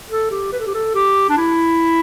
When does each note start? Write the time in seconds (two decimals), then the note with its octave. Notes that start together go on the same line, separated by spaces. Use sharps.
0.10 A4
0.31 G4
0.52 B4
0.60 A4
0.67 G4
0.74 A4
0.95 G4
1.30 D4
1.37 E4